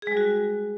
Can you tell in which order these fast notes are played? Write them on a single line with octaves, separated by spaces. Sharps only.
G#4 G#3 G3 F#4